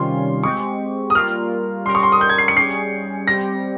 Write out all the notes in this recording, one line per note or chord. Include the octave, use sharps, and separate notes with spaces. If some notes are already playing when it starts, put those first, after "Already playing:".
Already playing: C3 D#3 G3 C#4 F4 C6
G#3 C4 G4 C#6
D#6
G3 A#3 F4 A#4 F6
G3 C#4 G4 A#4 C6
C#6
C6
D#6
G6
G#6
C7
C#7
G3 C#4 G#4 C7
G3 C4 G4 A#6